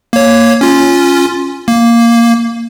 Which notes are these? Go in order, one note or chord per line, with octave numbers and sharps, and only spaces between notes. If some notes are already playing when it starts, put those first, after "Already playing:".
A#3 C#5
C#4 F4
A#3